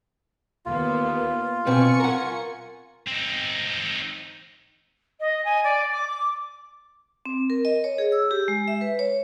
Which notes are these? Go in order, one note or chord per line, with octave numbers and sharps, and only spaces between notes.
D#2 A#3 B3 F4
B2 C4 B4 G#5 C#6 C#7
A#4 F#5
C4 D#4
D#5
G#5
D5
D6
D6
C4
A#4
D#5
C#5
G#4
E6
G4
G#3
E5
B4
C#5